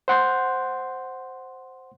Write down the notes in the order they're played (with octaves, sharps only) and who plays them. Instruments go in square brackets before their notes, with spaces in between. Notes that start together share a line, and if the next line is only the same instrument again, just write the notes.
[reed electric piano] C5 F#5 C6 G6